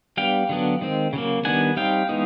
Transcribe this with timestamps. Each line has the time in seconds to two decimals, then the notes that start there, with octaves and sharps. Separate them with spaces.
0.17 G3 B3 D4 F5 G5
0.49 D3 F#3 B3 D4
0.81 D#3 G#3 C4
1.13 C#3 F#3 A#3
1.45 D#3 G3 B3 D4 F#5 G#5
1.77 G3 C4 D#4 F5 G5
2.09 E3 G#3 B3 D#4